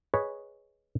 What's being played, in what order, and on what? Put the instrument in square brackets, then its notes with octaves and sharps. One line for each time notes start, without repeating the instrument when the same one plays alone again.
[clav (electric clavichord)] G#4 B4 C#5 D#5